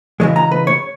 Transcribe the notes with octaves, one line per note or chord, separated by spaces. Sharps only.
C#3 E3 G#3 C#5
A#5
B4
C#5